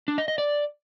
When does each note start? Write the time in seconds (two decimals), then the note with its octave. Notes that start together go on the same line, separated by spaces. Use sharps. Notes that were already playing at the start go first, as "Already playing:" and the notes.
0.08 D4
0.18 D#5
0.28 D#5
0.38 D5